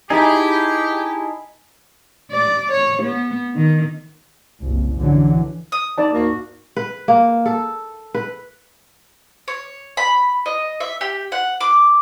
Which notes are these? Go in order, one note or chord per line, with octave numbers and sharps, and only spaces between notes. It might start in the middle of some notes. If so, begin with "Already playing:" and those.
D#4 E4 G4 G#4 G#5 A5
D5
C#5
B3
D#3
F#1 C2
F#2 D3 E3 F#3
D#6
D#4 D5 A5
D2 G#2 A#3 F#4
B4
A#3
A4
B4
C#5
B5
D#5
E5
G4
F#5
D6